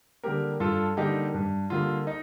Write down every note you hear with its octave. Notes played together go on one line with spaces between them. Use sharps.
D3 G3 A#3 G4 A#4
G2 F4 A4
D3 G3 A#3 D#4 G4
G2
D3 G3 A#3 F4
D#4